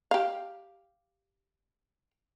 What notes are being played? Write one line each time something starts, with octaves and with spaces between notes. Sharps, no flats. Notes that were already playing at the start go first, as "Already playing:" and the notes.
G4 F5